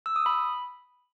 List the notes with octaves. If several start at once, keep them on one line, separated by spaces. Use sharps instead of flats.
E6
D#6
B5